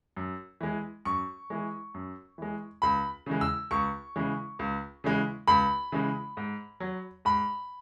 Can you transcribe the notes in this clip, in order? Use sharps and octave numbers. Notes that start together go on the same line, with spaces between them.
F#2
E3 G#3
F#2 C#6
E3 G#3
F#2
E3 G#3
C#2 B5
C#3 E3 G#3
E6
C#2 C#6
C#3 E3 G#3
C#2
C#3 E3 G#3
C#2 B5
C#3 E3 G#3
G#2
F#3
G#2 B5